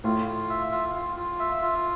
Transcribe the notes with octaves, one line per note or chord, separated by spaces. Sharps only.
A2 F4
F4
E5
F4
F4
F4
E5
F4